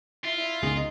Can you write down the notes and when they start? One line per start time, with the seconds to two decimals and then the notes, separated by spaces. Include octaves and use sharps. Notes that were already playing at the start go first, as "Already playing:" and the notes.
0.25 E4 F4
0.37 E4
0.62 C#2 B2 D#3 G#4
0.76 D#4